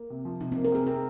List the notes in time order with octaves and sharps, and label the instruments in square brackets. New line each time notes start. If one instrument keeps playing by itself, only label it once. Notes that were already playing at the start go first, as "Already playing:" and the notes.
Already playing: [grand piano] A#3
C3
F3
[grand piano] C3 [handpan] D#4
[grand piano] A#3 [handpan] C4
[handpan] A#4
[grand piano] C3 [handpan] G#4
[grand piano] C4 [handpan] A#4